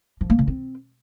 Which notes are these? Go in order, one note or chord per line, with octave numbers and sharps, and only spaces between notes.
F3
A#3
C#3
C4